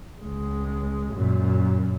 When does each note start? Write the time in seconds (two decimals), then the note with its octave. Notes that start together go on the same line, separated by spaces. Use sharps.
0.21 C#2 G#3
1.14 F#2 A#2